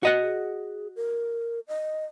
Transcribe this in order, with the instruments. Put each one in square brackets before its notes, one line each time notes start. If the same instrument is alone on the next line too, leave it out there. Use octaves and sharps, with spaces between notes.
[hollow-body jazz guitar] F#4 D#5 F#5
[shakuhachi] G#4
A#4
D#5